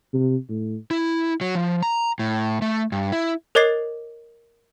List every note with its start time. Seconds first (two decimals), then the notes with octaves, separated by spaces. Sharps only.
0.13 C3
0.49 A2
0.91 E4
1.41 F#3
1.55 F3
1.83 A#5
2.19 A2
2.62 A3
2.92 G2
3.12 E4
3.55 A#4 C#5 D#5 D6 A6 C7